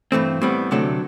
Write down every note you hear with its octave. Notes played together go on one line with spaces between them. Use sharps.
G2 E3 A3 C4
A2 G3 B3 C4
D2 C3 F#3 A3 D4